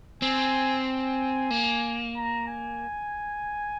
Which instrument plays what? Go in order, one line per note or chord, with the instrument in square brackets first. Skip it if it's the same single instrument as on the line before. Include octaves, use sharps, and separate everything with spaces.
[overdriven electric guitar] C4 [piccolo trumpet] G#5
[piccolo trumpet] G#5
[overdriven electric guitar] A#3
[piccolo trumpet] A#5
G#5